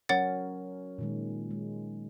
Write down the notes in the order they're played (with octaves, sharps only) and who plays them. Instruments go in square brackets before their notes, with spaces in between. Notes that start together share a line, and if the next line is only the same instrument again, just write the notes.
[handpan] F#3 C#4 A#4 [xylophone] C#5 F#5 A6
[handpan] A#2 D#3 G#3
G#3